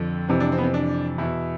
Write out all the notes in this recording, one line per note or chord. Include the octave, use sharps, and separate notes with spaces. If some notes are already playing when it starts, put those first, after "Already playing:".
Already playing: F2 D3 F3
F2 C3 E3 C4
D4
C4
B3
C4
D4
E2 B2 E4